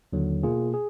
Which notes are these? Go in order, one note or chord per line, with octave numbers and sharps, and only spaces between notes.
D#2 D3 F#3
B2 A#3 F4 G#4
G#4